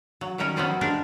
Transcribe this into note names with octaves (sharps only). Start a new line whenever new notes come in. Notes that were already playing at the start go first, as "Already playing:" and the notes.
F#3
D#3 F#3 G3 C#4 A#4
F#3 B3 C#4 C5 D5 D#5
G#3 D4 G4 A#4 F5